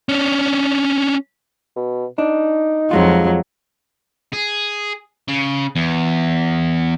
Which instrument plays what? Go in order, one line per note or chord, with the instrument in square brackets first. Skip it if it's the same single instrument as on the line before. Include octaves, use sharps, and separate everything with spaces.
[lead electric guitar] C#4 D4
[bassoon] B2
[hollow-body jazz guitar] D4 [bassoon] D#4
[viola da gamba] F2 F#3 [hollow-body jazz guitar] F3 G#3 F4
[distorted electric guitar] G#4
C#3
E2